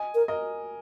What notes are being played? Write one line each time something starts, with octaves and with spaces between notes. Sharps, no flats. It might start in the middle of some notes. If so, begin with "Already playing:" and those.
Already playing: D#5 G#5
A#4
A#4 D#5